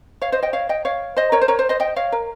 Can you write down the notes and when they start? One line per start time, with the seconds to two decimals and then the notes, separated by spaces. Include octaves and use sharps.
0.22 C#5 F5
0.32 C5 D#5
0.42 D#5 G5
0.53 C#5 F5
0.69 D#5 G5
0.85 C#5 F5
1.17 C5 D#5
1.32 A#4 C#5
1.41 C5
1.48 A#4 C#5
1.59 C5
1.69 C5 D#5
1.80 D#5 G5
1.96 C#5 F5
2.12 A#4